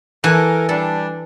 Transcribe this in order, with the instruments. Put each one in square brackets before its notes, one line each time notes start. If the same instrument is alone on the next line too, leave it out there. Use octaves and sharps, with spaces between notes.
[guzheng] E3 [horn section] A4 A#4 [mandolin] G#5 F#6
[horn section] G3 D4 [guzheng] A4